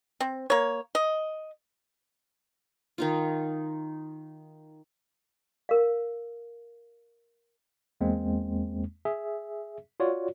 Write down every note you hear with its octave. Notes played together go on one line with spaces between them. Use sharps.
C4
A#3 C#5
D#5
D#3 D#4 F4
A#4 F5
E2 G#3 A#3 C4
G#4 E5
F4 F#4 C#5 D5